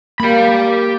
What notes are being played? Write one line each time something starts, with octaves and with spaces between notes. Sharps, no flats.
A#3 G4 B5